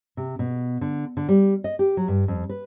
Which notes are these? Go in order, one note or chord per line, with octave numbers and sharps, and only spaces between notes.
C3
B2
D3
D3
G3
D#5
G4
F#3
G2
F2
B4